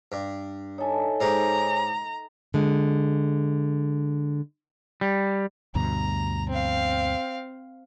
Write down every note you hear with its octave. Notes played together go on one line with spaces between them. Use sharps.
G2
D#4 A4 C#5 E5 G#5
G#2 G4 A#5
D3 G#3
G3
D2 G2 B2 A#5
C4 F5